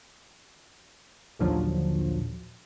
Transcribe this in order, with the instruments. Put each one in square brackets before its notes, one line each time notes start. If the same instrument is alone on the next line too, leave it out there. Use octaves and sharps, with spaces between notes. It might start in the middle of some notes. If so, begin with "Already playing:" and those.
[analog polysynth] A#1 D#2 A#2 D3 F3 F#3